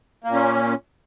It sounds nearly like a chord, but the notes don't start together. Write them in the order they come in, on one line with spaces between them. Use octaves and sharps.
A#3 A#2 C#4